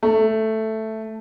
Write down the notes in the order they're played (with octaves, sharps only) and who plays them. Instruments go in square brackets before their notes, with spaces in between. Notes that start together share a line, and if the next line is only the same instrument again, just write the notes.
[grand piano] A3